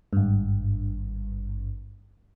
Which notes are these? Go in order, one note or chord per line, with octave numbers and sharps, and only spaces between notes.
G#1 G2